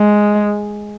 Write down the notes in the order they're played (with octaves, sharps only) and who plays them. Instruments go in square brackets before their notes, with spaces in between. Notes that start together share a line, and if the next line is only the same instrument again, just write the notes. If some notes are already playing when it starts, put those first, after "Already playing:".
Already playing: [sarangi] G#3